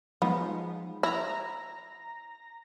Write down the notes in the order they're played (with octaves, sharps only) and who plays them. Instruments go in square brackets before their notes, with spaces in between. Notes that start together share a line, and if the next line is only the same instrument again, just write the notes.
[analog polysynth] F3 G#3 D#4 [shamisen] B3
[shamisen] E4 [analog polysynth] A#5 A#6